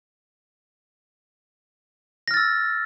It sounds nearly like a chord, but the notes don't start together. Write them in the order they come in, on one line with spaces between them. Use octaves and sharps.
A#6 F6 A6 E6